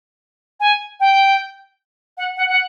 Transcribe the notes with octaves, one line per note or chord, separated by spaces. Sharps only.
G#5
G5
F#5
F#5
F#5